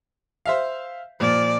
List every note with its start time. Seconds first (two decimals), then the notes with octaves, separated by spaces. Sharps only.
0.46 C5 E5 F5
1.20 A#2 F3 D5